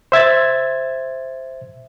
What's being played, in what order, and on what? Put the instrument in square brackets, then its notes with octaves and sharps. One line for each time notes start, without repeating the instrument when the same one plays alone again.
[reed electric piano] C5 E5 G#6 A6